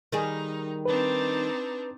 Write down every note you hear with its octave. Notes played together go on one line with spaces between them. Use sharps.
D#3 G3 D#4 G#4
C4 D4 D#4 B4